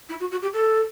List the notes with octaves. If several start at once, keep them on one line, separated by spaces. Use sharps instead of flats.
E4
F#4
F#4
G4
A4